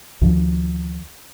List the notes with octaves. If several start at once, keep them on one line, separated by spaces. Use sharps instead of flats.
D2 D#3 F3